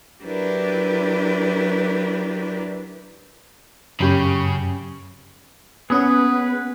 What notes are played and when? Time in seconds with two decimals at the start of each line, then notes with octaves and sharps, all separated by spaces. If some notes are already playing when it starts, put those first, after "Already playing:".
0.23 F#3 D4 E4 G4 A#4 B4
4.00 F#2 C#3 C#4 G4 B5
5.90 A#3 B3 C#4 G#4 B4 F#5 D#6